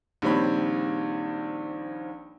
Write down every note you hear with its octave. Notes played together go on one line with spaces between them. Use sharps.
A#1 D#3 G3 C4 C#5 B5